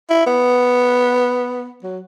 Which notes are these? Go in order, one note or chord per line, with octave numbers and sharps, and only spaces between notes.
E4
B3
F#3